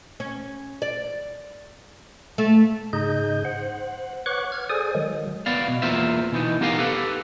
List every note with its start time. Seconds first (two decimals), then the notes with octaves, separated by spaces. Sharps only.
0.20 C#4
0.82 D5
2.38 A3
2.93 G#2 C#3 D#4 G#4 D#5 G6
3.45 C5 F#5
4.26 B4 C#5 F#5 C#6 D6 F#6
4.52 F6 G#6
4.70 G#4 A4 C5 D5 G#5 D#6
4.95 D#3 F#3 G#3
5.46 B3 D5 F5
5.68 B2
5.82 E2 A#3 F4 C5 E5
6.32 B2 E3 D#4
6.61 B3 D#4 G4 A#4 F5 G#5
6.78 G4 A4 B4